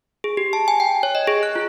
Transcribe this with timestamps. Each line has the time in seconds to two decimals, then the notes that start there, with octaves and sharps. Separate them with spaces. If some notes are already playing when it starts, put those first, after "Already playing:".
0.24 G#4
0.37 G4
0.53 A5
0.68 G#5
0.80 G5
1.03 C#5
1.15 D#5
1.27 G#4
1.43 F#6
1.56 F4